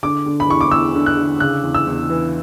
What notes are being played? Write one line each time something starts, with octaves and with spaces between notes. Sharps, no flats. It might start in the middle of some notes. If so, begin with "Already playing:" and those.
D3 D6
D3
B5
E2 C#6
D6
E2 E6
D3
F#6
D3
C#3 F#6
E2
E6
E2
E3